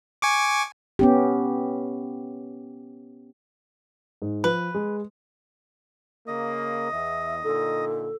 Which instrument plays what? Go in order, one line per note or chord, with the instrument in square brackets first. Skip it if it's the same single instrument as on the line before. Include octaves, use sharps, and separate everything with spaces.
[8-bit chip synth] G#5 C#6 D6
[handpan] B3 C#4 G4
[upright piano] G#2
[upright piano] F3 [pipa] B4
[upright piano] G#3
[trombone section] C#3 A#3 [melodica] D#5
[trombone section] E2 [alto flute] E5
[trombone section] A#2 D3 D#4 [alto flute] A4